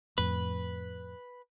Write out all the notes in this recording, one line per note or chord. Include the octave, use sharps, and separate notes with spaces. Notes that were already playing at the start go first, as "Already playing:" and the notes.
F2 A2 B4